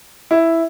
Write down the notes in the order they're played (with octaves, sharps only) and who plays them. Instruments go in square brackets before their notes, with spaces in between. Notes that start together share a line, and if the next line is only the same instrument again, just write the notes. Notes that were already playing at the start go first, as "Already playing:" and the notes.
[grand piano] E4